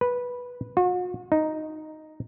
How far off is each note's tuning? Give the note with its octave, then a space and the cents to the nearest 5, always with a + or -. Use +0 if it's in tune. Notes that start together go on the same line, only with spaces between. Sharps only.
B4 -10
F#4 -45
D#4 +0